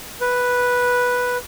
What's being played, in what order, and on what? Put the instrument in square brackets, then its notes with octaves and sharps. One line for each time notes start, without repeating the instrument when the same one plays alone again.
[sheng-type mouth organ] B4